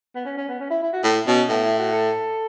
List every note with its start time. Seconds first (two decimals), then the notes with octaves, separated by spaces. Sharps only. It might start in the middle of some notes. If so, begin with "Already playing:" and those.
0.15 B3
0.25 C#4
0.37 C#4
0.49 B3
0.60 C#4
0.70 E4
0.82 E4
0.93 F#4
1.04 A2 E4
1.27 B2 C#4
1.49 A2 B3
1.64 E4
1.79 F#4
1.93 A4